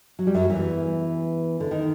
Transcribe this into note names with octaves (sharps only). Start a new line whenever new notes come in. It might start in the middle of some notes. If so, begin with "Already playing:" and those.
F#3
G3
F#2 F#3
E2 E3
D3
D#3